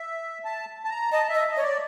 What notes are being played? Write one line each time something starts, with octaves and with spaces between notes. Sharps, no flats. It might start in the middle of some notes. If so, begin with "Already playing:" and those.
Already playing: E5
A5
A5
A#5
D#5 A5
E5
D#5
D#5
C#5
D5